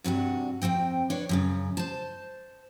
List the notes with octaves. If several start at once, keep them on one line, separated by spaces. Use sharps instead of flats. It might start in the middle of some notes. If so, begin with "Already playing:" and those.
G2 C3 D4 F#4
F2 F#3 C4 G5
D4 B4 C#5
F#2 A#2 C#3
C5 A5